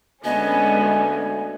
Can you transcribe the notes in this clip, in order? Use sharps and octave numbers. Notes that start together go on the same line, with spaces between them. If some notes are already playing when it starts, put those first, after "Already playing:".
D2 G#3 B3 C#4 D#5 G#5